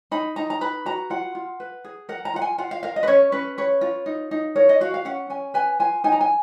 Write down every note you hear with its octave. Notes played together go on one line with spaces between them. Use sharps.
D#4 B5
D#4 A#5
A#5
B4 B5
F#4 A#5
F4 F#5
F4
B4
G#4
A#4 F#5
A#5
F4 F#5
G#5
F4 F#5
F5
A#4 F5
D#5
B4
C#4 C#5
C#4 B4
B4 C#5
F4
D#4
D#4
A#4 C#5
D#5
F#4 F5
F5
C#4 F#5
C#4 G#5
B4 G#5
F4 G#5
D#4 G#5
A#5
G#5